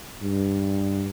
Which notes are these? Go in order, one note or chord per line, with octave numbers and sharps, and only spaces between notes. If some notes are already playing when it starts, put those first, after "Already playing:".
G2